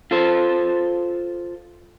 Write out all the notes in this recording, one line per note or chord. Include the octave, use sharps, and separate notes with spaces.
F4 A4 C5